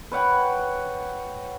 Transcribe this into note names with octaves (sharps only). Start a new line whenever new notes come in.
B4 C#5 F#5 G5